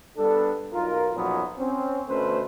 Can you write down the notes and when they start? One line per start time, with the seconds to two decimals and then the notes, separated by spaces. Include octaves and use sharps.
0.18 G3 B3 D4 A4
0.72 B1 F4 A#4
1.14 B1 F#2 A#2 F3 F#3 B3
1.57 C4 C#4
2.07 D2 B2 A3 C#4 B4 C5